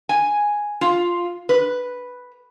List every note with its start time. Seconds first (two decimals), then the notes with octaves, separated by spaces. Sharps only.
0.09 G#5
0.81 F4
1.49 B4